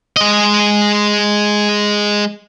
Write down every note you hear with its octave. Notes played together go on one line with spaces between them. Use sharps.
G#3 D#5